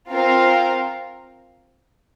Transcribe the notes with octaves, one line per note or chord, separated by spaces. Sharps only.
C4 F4 A#4 F5